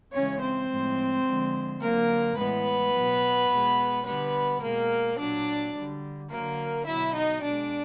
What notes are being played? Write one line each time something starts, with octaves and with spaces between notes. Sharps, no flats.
C#3 E3 G#3 C#4 C#5
C4 C5
A2 F3 G#3
D3 F3 G#3
D3 F#3 A#3 A#4
A2 E3 G#3 B3 B4
B2 F#3
B2 G#3
D3 G3 B3 B4
B2 G#3 A#3 A#4
A#2 F#3 D4 D5
D3 G3
D3 F#3 A#3 A#4
B2 F#3 E4 E5
D#4 D#5
B2 G#3 D4 D5